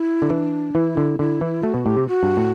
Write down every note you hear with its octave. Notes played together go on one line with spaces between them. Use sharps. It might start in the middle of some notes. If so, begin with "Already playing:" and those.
Already playing: E4
D3
E3 D4
E3 E4
D3
D3 E4
E3
A3 F#4
B2
A2 G4
C3
F#4
G2
A2